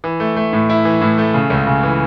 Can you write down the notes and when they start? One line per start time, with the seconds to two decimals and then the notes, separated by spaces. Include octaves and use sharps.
0.04 E3
0.20 A3
0.36 A3
0.53 A2
0.70 E4
0.85 E3
1.01 A2
1.18 A3
1.34 C#3
1.50 C#2
1.67 C#3
1.83 E3